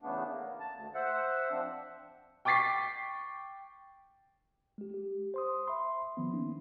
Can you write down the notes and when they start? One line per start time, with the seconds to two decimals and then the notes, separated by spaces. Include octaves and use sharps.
0.01 E2 C#3 A3 B3 D4
0.30 A#3
0.60 A5
0.75 D2
0.95 C5 E5 F#5
1.51 F3 C4 D4
2.45 G5 C#6 D6 A6 B6 C7
4.78 G#3 G4
4.94 G4
5.34 C5 C6 D#6
5.68 E5 B5 C6
6.17 D#3 F3 B3
6.33 A#3 C#4 D#4